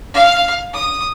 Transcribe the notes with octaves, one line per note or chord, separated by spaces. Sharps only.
F5
D#6